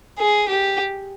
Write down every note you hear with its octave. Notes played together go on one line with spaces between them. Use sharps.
G#4
G4